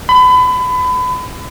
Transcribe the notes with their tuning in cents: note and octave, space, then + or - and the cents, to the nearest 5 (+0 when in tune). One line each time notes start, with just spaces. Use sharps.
B5 +30